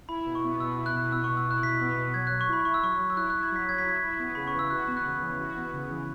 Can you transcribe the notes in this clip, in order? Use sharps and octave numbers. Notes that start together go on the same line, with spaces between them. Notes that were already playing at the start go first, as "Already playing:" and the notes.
E4 B5
B2
C#6
B3
B2 E6
E4
F#6
B2
B3 E6
B2 C#6
E6
E4 F#6
B2 B6
B3
B2
F#3 G#6
F#3 F#6
C#6
E4 B5
E4 C#6
E6
F#3 C#6
F#3
E6
E4 F#6
E4 F#6
G#6
F#3 B6
F#3 G#6
B6
E4 G#6
E4
B3
C#3 B5
C#6
E3 E6
F#4 F#6
B3
F#6
C#3
E3
F#4
B3
C#3
E3